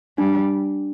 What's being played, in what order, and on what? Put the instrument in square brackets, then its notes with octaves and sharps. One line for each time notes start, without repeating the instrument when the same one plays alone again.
[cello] G3 [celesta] D4